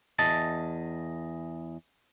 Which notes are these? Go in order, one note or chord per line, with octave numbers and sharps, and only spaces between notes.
E2 D#5 A5